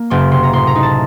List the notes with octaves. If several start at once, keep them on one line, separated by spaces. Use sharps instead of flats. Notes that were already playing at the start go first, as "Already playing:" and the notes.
Already playing: A#3
F#1 C6
C3 C6
A#5
A2 C6
A#5
D#4
A5